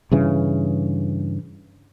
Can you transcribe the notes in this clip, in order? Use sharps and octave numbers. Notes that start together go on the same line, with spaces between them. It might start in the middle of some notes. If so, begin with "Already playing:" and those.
G2 C#3 E3